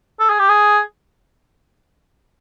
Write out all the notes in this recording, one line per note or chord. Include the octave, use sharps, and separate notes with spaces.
A4
G#4
G4
G#4